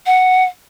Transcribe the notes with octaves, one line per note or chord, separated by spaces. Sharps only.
F#5